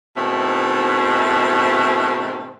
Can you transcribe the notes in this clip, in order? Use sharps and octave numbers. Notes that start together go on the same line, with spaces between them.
G#2 B2 D#3 A3 C4 E4